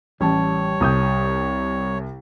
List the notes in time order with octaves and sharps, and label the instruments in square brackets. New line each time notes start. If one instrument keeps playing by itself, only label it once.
[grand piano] A1 [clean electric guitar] G3 A5 [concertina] C#5
[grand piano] C2 D#6 G6